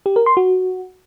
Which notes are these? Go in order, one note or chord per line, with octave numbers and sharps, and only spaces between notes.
G4
A#4
C6
F#4